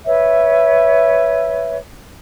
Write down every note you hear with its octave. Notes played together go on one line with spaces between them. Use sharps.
B4 C#5 E5